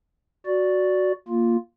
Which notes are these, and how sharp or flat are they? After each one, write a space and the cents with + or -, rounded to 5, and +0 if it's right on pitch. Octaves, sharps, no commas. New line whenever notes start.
F#4 +0 D5 -5
A#3 +0 F4 +0